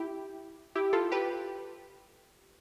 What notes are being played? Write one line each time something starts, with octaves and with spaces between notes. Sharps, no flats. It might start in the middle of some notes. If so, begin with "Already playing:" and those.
Already playing: E4 G4
E4 G4
F4 A4
G4 B4